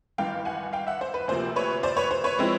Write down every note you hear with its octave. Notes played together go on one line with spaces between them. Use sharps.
G#1 G2 E3 F5 G5
F#5 G#5
F5 G5
E5 F#5
C5
B4
D2 C3 F3 A#3 C5
B4 C#5
C5 D5
B4 C#5
C5
B4 C#5
F3 G#3 C4 E4